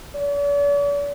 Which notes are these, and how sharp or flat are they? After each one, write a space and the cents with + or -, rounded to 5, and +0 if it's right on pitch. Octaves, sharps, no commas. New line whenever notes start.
D5 -45